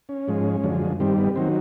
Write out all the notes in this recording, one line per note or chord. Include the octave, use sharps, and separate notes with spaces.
C#4
G#2 F3 G#3
F#2 D3 F3 G#3
G2 D#3 G3 C4
B3
D#3 F#3 C4